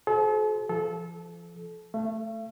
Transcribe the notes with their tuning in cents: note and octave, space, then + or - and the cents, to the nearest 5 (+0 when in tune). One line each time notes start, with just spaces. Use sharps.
F#4 +0 A4 -45 C5 +0
F3 -35 A4 -25
A3 +0 E5 +45